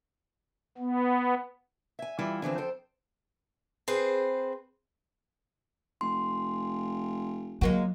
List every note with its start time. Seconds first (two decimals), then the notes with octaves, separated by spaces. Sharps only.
0.78 B3
1.99 E5 G#5
2.19 E3 G3 E4 F4
2.42 D3 E3 F3 C4
2.58 F2 A4 C5 G5
3.88 C4 G#4 B4 C5
6.01 F1 C6
7.61 F#3 G#3 A#3 F#4